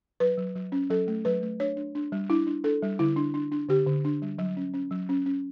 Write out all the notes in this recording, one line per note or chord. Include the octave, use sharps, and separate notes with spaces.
F#3 B4
F#3
F#3
C#4
F#3 A4
A3
F#3 B4
A3
D4 C#5
D4
D4
G3
D4 E4
D4
D4 A4
G3
D3 E4
D4
D4
D4
D3 G4
D3
D4
G3
F#3
C#4
C#4
F#3
C#4
C#4